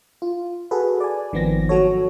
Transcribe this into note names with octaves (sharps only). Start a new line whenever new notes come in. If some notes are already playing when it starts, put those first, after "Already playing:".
F4
F#4 G#4 A4 B4
D5 G#5
G#1 D#3 F3 B3 C4 A#6
F#3 F#4 A4 C#5